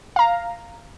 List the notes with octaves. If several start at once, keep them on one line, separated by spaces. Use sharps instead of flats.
F5 A#5